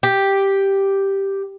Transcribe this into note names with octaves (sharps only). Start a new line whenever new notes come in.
G4